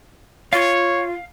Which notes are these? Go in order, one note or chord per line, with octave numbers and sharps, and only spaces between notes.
F4 C#5 F5